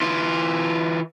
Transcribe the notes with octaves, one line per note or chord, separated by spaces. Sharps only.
E3 F4